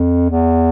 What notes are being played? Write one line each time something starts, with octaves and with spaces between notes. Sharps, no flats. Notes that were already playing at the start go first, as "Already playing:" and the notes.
Already playing: F2
E2